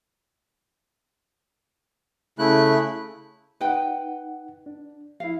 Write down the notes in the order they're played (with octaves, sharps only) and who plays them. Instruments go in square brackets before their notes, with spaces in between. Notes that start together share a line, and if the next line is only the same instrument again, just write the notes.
[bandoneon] C#3 A3 [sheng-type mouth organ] E4 F#6
[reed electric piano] D#4 F#5 [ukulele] B4 G5
[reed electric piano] D4
[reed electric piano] F3 E4 [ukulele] F5